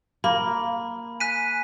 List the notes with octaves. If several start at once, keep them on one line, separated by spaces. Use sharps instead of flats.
A#3 B5
G#5 F#6 B6 D#7